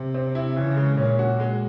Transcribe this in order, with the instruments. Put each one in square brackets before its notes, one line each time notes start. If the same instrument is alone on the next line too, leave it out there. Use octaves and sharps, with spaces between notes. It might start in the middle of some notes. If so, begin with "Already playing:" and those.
Already playing: [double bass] C3
[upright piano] C4
E4
[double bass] C#3 [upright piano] E3
[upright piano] G#3
[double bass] A#2 [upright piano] C#4
[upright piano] F#4
G#3